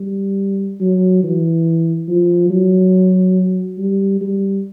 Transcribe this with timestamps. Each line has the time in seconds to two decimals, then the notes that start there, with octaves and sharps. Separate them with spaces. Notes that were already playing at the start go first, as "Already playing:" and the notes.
Already playing: G3
0.80 F#3
1.24 E3
2.08 F3
2.50 F#3
3.78 G3
4.21 G3